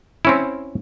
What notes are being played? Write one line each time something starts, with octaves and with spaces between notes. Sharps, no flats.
C4 C#4 E4